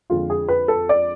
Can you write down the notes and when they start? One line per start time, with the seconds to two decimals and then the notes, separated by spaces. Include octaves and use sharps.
0.10 F2 D3 G#3 F4
0.30 G#4
0.48 B4
0.68 A4
0.89 D5